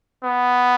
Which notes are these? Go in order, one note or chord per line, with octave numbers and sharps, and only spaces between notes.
B3